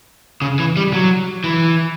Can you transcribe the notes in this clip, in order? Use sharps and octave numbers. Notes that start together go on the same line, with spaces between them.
C#3
E3
G3
F#3
E3